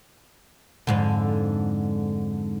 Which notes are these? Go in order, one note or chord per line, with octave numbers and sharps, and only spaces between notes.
F2 G#2 D3